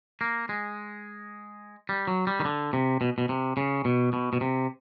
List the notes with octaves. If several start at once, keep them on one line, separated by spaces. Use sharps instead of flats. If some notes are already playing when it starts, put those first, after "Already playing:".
A#3
G#3
G3
F#3
G3
D#3
D3
C3
B2
B2
C3
C#3
B2
B2
B2
C3